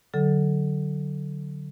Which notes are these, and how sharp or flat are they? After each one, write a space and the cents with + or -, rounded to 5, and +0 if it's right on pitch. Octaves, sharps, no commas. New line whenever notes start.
D3 -10 F#3 +0 A4 +0